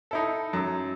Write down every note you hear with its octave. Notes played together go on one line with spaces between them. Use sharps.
D#4 E4 A4
F#2